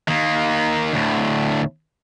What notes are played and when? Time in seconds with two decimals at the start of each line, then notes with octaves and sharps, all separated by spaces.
0.08 D#3 A#3
0.93 D2 A2